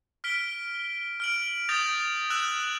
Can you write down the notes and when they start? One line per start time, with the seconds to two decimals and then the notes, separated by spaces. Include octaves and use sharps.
0.24 F6 B6 D7 G7
1.20 F6 D7 F#7
1.69 D#6 G6 A6 A#6 F7
2.30 E6 F#6 E7 F#7